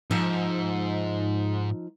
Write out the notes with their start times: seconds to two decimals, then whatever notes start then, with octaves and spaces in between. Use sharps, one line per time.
0.11 G#2 F3 D#4 E5